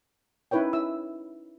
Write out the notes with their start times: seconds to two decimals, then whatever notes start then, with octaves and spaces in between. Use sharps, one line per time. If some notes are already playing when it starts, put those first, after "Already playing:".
0.51 C#4 D#4 E4 B4 C#5 G5
0.73 E4 E5 E6